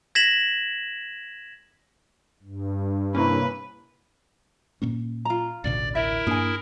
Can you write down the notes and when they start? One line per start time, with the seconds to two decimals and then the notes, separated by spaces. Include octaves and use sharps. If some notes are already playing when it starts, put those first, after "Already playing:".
0.15 G#6 A#6 B6 E7 F#7
2.43 G2
3.15 C3 A#3 C#4 E4 B4
4.82 A#2 A#3 C#4
5.25 F4 A#5
5.64 A1 D2 B2 D5
5.95 E4 A#4 E5
6.27 G2 A#3 D4 G#4 G#5